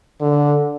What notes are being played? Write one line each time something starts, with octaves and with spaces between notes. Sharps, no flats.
D3